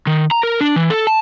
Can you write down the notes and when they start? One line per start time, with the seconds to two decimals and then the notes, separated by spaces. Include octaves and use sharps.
0.07 D#3
0.31 A#5
0.43 A#4
0.61 D4
0.76 E3
0.90 A4
1.07 A5